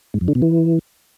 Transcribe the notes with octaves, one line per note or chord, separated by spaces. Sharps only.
G#2
F2
D3
B2
E3